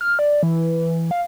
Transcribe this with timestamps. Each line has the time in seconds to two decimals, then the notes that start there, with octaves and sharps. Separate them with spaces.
0.01 F6
0.19 D5
0.43 E3
1.11 F5